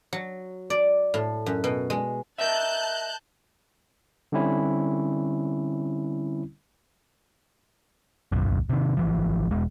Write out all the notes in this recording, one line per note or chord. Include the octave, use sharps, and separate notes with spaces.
F#3
D5
A2
F#2
B2
G#3
A#4 D#5 E5 A5 F#6 G6
D3 G3 C4 C#4 E4
D1 B1 F#2
C3 D#3
G#1 E3 F3
E1 G#3